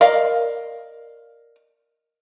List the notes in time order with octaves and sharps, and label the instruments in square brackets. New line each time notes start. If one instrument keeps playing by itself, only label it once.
[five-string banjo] A#4 D5 D#5 F5